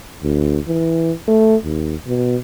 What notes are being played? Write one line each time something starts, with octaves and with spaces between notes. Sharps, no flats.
D2
E3
A3
D#2
B2